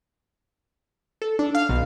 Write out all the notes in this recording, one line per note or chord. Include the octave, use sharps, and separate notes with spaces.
A4
D4
F5
B1